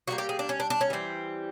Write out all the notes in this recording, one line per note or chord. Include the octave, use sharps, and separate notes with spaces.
E3 G3 A#3 F#4
G4
G#4
D4
C#4
D4
D4
C#4
E3 G3 C4